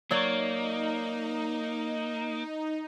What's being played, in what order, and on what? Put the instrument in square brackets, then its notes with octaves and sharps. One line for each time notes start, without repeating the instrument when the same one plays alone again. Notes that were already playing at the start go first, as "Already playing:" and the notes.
[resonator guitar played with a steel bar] F#3 C#5 D5 [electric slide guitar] A#3 [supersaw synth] D#4